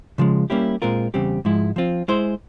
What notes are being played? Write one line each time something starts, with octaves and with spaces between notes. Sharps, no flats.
C#3 F3 G#3
G3 A#3 C#4 E4 G4
A#2 G#3 C4 F4 A#4
E2 C#3 G3 C4 G4
G#2 F3 G#3 E4
F3 C4 F4
G#3 E4 G#4 C5